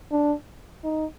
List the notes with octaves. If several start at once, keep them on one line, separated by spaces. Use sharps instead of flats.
D4
D#4